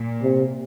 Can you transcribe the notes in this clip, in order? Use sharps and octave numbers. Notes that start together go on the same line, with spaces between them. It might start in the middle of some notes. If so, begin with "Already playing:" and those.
Already playing: A#2
C3